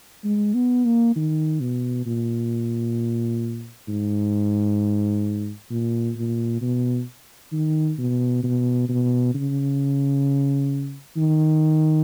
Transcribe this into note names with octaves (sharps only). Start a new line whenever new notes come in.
G#3
B3
A#3
D#3
B2
A#2
G#2
A#2
A#2
B2
D#3
B2
B2
B2
C#3
D#3